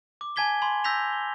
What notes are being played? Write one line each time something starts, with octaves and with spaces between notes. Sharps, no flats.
D6
G#5 A5 G#6 B6 G7
G#5 B5 C6
E6 G6 A#6 B6 F7
G7